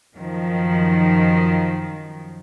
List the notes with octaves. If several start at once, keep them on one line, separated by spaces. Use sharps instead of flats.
F#2 D#3 F3